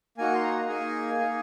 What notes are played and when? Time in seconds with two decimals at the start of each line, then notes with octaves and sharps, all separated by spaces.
0.18 A#3 D#4 F#4 G#5
0.35 C6
0.43 A#5
0.68 A#3 D#4 G#4 G#5
1.19 A#3 D#4 G#4